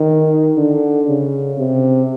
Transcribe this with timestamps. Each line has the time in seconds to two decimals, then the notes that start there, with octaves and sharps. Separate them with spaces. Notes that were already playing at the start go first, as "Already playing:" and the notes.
Already playing: D#3
0.57 D3
1.08 C#3
1.58 C3